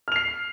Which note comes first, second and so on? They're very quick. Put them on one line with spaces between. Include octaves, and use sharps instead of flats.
F6 F7 C7